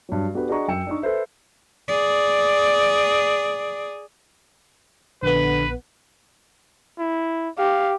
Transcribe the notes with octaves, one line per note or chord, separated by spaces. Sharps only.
G2 F#3
B3 D4 F#4 G4 A4 B4
D4 F#4 G#4 D#5 A#5 C#6
F#2 G5 E6 C#7 E7
D4 D#4 C#6
A4 B4 C5 E5
G#4 D5
A#1 D3 B3 B4
E4
G4 F5